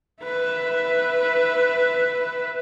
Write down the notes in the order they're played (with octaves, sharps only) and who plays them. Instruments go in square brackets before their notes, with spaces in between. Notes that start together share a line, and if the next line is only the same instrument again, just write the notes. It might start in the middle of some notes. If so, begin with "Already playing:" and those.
[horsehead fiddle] B4 E5